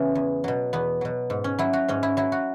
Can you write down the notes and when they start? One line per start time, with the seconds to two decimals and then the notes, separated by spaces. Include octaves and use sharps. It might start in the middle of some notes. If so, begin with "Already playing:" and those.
Already playing: C#3 E3 B3 C#4
0.15 E2
0.44 B2 F#3
0.73 E2 B3
1.01 B2 F#3
1.30 G#2
1.44 C#4
1.59 F#3 E4
1.73 F#4
1.88 G#2 C#4
2.03 E4
2.17 F#3 E4
2.32 F#4